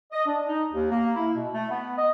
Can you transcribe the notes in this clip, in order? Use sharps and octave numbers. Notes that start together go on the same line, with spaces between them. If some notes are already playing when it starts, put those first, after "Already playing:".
D#5
D4
D#4
D#2
A#3
E4
B2
A3
B3
D#5